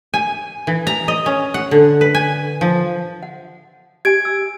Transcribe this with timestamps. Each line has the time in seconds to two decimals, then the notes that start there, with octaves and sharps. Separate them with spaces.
0.14 G#5
0.67 E3
0.87 A#5
1.08 D#5
1.26 C#4
1.54 F#5
1.71 D3
2.01 B4
2.15 G#5
2.61 F3
3.23 F#5
4.05 G4 G#5 G#6 D7
4.25 E6